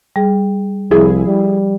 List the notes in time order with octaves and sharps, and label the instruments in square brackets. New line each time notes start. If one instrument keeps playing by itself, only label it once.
[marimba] G3 G#4
[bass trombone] C2 [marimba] F3 [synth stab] E4 G#4
[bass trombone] G3